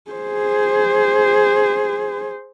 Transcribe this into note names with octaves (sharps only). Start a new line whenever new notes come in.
G#4 C5